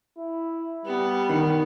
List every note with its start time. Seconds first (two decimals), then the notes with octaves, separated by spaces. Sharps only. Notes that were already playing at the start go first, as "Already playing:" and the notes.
0.18 E4
0.86 G3 B3
1.30 D#3